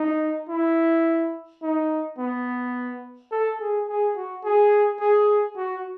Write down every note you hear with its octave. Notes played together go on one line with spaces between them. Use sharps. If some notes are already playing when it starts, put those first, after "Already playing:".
Already playing: D#4
E4
D#4
B3
A4
G#4
G#4
F#4
G#4
G#4
F#4